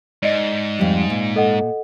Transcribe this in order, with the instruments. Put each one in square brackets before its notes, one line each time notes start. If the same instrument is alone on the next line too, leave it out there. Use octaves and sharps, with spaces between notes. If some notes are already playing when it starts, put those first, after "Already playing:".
[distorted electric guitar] G#2 [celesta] D5 D#5
[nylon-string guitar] F2 G3
A#2
[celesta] A4 D#5 F#5